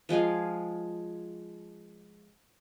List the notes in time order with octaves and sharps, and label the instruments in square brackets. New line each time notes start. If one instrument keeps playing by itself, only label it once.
[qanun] F3 G#3 G#4 F5